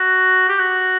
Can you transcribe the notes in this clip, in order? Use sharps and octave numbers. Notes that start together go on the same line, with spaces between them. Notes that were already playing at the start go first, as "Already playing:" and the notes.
Already playing: F#4
G4
F#4